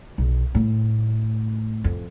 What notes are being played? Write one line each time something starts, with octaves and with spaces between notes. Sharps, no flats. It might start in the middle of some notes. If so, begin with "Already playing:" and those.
B1
A2
F2